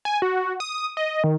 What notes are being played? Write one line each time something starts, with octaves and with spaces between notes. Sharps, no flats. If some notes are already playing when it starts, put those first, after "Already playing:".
G#5
F#4
D#6
D#5
D#3